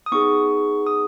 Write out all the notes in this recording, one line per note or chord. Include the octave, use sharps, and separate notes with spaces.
D#6
B3 D#4 G#4 C#6
D#6